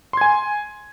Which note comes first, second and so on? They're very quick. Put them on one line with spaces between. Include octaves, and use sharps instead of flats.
C6 G#6 G#5